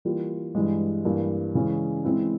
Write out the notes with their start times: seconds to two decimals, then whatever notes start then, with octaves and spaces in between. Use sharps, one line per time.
0.05 E3 G3 A#3 F4
0.55 G2 E3 G#3
1.05 G2 E3 A#3
1.55 C#3 E3 G#3 C#4
2.04 E3 G#3 C4 E4